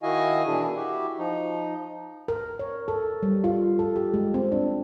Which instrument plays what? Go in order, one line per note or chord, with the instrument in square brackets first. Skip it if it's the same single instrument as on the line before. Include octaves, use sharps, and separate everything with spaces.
[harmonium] D#3 E4 F#4 D#5 F5 G#5
B2 E3 D4 E4 G#4
E4 F#4 G4
F3 D#4
[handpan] A#4
C#5
A4
G3
F4
A4
G4
G#3
C4
D4